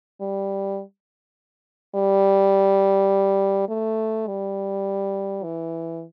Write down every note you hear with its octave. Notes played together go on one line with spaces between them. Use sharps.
G3
G3
A3
G3
E3